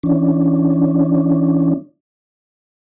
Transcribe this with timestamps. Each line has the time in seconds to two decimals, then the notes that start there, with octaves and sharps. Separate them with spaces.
0.03 E3 C#4 D4